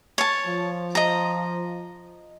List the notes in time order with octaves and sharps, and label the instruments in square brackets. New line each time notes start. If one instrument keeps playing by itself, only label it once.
[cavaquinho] C#5 A5
[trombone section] F3
[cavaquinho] D#5 A#5